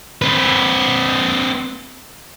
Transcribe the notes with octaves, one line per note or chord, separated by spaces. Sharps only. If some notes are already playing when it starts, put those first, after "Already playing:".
C4 B4